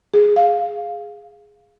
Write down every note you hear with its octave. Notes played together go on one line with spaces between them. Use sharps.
G#4
F5